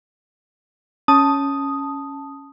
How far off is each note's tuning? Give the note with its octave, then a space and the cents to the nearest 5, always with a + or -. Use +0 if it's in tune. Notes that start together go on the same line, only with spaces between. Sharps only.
C#4 +0 A5 +0 D#6 +0